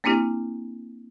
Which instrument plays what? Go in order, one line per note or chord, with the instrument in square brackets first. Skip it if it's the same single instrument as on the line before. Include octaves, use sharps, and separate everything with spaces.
[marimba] A#3 C4 D4 E4 G4